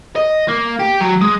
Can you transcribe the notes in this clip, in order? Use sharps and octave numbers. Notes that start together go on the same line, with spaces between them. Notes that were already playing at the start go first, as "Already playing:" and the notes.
D#5
A#3
G4
F#3
G#3